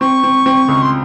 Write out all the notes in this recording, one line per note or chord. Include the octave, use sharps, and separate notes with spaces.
C4 C#6
C4
C4
C#2
C6